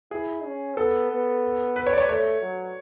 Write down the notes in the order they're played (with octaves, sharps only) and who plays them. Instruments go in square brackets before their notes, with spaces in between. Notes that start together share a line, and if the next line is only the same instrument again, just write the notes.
[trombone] E4 [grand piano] G#4
[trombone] C#4
[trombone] B3 [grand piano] A4
[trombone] B3
[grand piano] B4
C#5
D5
C#5
[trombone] A3 [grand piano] C#5
[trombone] F#3